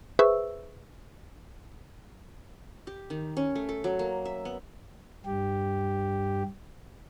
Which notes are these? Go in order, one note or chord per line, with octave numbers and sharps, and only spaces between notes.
G#4 B4 C5 E5 C#6 E6
G4
D#3
C#4
A3
A4
F#3
A#3
E5
B3
G2 G4